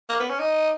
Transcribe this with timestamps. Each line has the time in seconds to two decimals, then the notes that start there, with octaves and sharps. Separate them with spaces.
0.09 A#3
0.20 B3
0.30 C#4
0.40 D#4